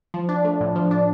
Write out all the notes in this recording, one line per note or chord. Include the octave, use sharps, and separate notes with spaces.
F3
D4
A3
A2
F3
D4